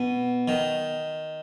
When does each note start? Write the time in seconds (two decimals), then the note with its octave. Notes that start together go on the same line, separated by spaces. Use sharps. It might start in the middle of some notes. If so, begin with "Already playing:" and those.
Already playing: B2
0.48 D#3